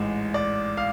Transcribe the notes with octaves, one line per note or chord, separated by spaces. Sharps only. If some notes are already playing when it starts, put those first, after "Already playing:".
Already playing: A1 G#2 G#3
D5
F5